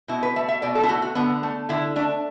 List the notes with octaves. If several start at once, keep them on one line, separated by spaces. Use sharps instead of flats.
B2 E4
B4
A3 E5
E5
B2 D5
A4
E4
A3 F#4
F#4
D3 B3
A3
D3 E4
A3 D4